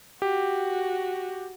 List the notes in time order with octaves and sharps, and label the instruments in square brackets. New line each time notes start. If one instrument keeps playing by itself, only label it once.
[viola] F#4 [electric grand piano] G4